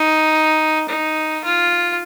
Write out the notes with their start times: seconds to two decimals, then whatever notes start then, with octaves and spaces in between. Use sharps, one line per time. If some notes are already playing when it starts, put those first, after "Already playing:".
Already playing: D#4
0.89 D#4
1.44 F4